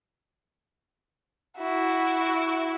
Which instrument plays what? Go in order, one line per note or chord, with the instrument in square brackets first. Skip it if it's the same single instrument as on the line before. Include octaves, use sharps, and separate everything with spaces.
[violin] E4 [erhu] F#4